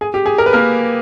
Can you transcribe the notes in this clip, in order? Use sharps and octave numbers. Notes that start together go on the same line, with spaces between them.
G#4
G4
G#4
A#4
B4
A#3 A#4